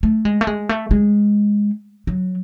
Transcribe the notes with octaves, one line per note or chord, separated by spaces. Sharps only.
A3
G#3
A3
G#3
A3
G#3
F#3